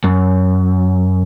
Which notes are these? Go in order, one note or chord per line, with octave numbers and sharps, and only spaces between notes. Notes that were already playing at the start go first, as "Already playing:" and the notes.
F#2